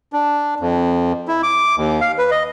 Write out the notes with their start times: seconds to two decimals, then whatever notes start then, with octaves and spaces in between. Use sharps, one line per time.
0.13 D4
0.60 F2
1.28 E4
1.43 D6
1.77 D#2
2.01 F5
2.18 B4
2.31 D#5